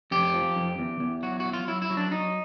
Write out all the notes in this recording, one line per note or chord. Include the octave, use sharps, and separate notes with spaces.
F2 G4
F3
F2
E2
E2
F#3 F#4
F#4
F#3
F4
F#3 E4
E4
F#3
D4
F#3 D#4